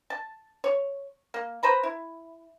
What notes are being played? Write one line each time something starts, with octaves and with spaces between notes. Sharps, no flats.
A5
C#5
A#3
B4 C5 A#5 B5
E4